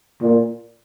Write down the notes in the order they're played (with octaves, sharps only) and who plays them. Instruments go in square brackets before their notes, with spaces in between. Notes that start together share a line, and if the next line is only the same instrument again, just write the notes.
[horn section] A#2